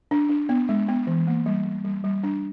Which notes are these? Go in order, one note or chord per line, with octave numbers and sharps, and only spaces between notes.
D4
D4
B3
G#3
B3
E3
A#3
G3
G3
G3
G3
D4